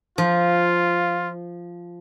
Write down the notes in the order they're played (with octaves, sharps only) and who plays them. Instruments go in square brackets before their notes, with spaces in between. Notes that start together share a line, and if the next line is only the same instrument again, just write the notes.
[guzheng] F3 [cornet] F4